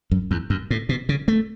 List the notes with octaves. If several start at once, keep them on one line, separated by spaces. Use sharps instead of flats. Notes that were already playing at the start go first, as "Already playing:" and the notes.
F#2
E2
F#2
A2
B2
C#3
A3